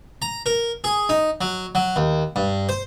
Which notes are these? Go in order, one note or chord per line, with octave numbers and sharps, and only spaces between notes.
A#5
A#4
G#4
D#4
F#3
F#3
D#2
G2
C5